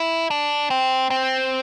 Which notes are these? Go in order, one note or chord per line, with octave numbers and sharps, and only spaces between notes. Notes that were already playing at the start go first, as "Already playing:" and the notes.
Already playing: E4
D4
C4
C4